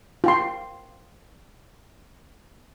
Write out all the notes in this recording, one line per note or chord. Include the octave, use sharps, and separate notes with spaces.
F4 G5 C6